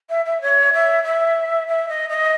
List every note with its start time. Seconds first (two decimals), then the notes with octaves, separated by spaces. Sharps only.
0.09 E5
0.25 E5
0.41 C#5
0.73 E5
1.03 E5
1.67 E5
1.88 D#5
2.09 D#5